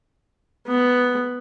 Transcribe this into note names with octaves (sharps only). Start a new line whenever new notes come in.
B3